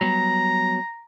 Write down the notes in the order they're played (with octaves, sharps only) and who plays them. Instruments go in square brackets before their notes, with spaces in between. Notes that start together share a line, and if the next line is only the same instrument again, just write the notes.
[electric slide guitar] F#3 G3 B3 [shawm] A#5